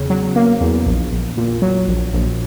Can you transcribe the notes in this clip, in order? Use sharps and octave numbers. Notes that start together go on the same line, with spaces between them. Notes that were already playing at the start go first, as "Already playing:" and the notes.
Already playing: E2 C#3
F#3
A#3
E2
A#1
A#1
A#2
F#3
A#1
A#1